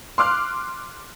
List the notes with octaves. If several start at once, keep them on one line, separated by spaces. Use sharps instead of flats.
C6 D6 F6 F#6